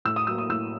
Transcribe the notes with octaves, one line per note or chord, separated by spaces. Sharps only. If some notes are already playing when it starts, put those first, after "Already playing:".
A2 E6
D#6
F#3 A#3 E6
D#6
A2 E6